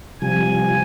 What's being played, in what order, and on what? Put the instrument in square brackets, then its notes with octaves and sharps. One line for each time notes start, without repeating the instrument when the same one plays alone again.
[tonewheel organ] C3 F3 G3 [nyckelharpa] G#5